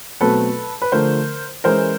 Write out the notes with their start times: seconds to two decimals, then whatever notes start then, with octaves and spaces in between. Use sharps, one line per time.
0.21 B2 F#3 A3 C4 A4 B4
0.82 B4
0.92 D3 F3 A3 A#4 C5
1.64 E3 G#3 C#4 E4 A#4 C5